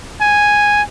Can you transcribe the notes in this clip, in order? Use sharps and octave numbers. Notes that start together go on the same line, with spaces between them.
G#5